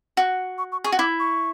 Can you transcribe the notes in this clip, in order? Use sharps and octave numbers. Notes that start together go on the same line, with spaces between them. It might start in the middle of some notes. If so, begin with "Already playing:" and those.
F#4
C#6
C#6
G#4 C#6
F#4
E4 D6
C#6